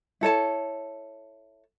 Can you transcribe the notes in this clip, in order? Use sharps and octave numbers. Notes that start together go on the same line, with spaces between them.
E4 A4 C#5 A5